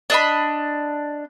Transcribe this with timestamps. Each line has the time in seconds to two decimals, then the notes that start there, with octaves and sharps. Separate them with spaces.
0.10 D4 D#5 B5